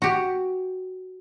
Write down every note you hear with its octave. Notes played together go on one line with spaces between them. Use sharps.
F#4 G4